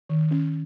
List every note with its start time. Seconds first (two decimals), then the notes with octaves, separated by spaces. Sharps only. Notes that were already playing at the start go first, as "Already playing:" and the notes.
0.09 D#3
0.31 C#4